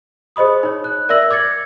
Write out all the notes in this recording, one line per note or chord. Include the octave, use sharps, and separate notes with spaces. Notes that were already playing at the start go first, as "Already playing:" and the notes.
G#4 C5 D#5 B5 D#6
D#4 C#5
F#6
A#4 D5 E5 E6 A#6 F#7
D6 G#6 A6 C#7